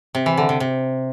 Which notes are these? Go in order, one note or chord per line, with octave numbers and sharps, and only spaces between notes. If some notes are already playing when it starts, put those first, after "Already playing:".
C3
E3
D3
C3
C3